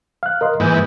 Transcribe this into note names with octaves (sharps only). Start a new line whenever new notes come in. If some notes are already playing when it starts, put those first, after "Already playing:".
F5 F#6
A#4 D#5 C6
G#2 E3 A#3 B4 G6